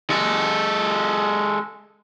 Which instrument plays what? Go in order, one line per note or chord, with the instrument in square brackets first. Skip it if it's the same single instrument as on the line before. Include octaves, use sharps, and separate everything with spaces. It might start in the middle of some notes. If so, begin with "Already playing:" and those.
[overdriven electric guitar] G#3 A4